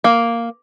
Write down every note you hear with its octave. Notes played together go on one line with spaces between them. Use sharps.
A#3